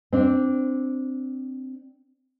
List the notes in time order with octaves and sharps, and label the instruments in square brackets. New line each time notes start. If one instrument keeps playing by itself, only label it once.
[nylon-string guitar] C4 D4